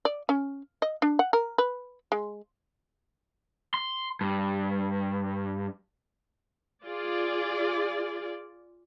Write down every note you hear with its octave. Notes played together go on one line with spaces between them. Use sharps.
D5
C#4
D#5
D4
F#5
A#4
B4
G#3
C6
G2
F4 G#4 D5